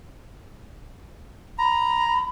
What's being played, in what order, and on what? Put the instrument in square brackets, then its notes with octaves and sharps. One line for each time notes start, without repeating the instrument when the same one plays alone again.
[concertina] A#5 [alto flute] B5